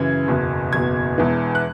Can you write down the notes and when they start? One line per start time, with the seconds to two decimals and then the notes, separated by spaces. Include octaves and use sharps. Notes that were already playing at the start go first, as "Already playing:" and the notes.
Already playing: F#2 C#3 E3 G#6
0.28 F#1 E2 B2
0.73 F#1 E2 B2 G#6
1.18 E1 E2 E3
1.55 F#6